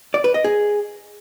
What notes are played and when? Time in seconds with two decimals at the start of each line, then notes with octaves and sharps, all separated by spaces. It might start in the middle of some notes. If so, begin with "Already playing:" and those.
0.14 D5
0.24 B4
0.34 D#5
0.44 G#4